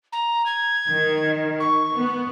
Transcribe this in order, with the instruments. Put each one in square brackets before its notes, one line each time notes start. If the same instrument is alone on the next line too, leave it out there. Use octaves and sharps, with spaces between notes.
[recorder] A#5
G#6
[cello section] D#3
[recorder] C#6
[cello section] B3